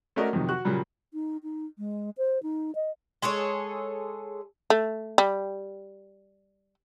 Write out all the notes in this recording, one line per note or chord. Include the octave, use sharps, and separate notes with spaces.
A3 C#4 F#4 A#4 D5 D#5
F2 C3 D#3 F#3
F#4 C#6 F#6
A#2 C#3 F#3 G3
D#4
D#4
G#3
C5
D#4
D#5
G#3 G#4 A4 C#5
A3
G3